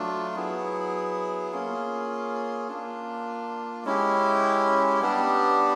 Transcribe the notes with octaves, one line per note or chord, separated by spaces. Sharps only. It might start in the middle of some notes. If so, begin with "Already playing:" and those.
Already playing: F#3 A3 D4 F4
F#3 B3 E4 G#4
A#3 C#4 F4 G#4
A#3 D4 F4
G#3 C#4 E4 G4
G3 B3 D4 G4